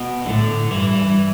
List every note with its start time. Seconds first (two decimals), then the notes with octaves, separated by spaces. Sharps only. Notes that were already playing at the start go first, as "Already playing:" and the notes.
Already playing: B2
0.25 A2 D3
0.70 G2 E3